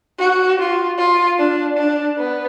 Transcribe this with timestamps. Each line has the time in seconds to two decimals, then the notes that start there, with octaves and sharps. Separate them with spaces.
0.19 F#4
0.59 F4
0.98 F4
1.38 D4
1.77 D4
2.18 B3